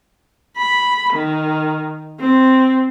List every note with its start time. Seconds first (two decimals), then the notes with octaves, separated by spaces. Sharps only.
0.57 B5
1.13 D#3
2.20 C4